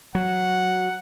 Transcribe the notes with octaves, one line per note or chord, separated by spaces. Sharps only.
F#3 F#5